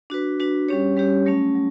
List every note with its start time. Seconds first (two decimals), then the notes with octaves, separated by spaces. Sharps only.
0.10 D4 F#4 B4
0.40 D4 F#4 B4
0.68 G3 C#4 G4 C#5
0.96 G3 C#4 G4 C#5
1.26 F#3 A3 C#4
1.55 F#3